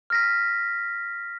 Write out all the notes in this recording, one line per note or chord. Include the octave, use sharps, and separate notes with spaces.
F6 A#6 B6